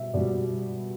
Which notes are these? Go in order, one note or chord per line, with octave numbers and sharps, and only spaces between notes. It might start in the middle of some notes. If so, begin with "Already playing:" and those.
Already playing: B2 G3 E5
B2 G3 D5